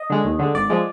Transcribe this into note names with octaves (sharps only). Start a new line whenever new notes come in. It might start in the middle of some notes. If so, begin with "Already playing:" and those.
Already playing: D#5
D3 G#3
D#2
D3 G#3
G#1 D5
F3 G#3